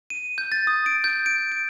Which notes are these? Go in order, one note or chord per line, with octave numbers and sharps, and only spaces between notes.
D#7
G6
A6
D#6
D7
G6
D7
D7